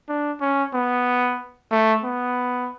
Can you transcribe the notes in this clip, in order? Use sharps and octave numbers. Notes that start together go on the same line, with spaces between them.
D4
C#4
B3
A3
B3